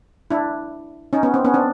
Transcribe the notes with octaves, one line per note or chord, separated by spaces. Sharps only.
D4 E4
C#4 D#4
B3 C#4
C4
B3 C#4
C4 D4